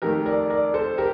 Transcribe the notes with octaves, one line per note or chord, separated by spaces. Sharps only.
F2 D#3 A3 G4 A#4
A#4 D5
A#4 D5
A4 C5
G4 A#4